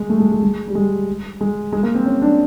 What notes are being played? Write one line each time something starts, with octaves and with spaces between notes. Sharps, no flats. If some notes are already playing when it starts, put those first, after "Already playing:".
Already playing: G#3
A3
G#3
G#3
G#3
G3
G#3
G#3
G#3
A#3
C4
C#4
D4